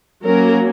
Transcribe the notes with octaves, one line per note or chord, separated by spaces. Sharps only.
F#3 A#3 C#4 A#4